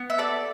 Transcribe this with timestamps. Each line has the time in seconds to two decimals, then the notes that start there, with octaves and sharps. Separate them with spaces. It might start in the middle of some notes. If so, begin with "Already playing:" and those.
Already playing: B3
0.10 E5
0.18 A4 D5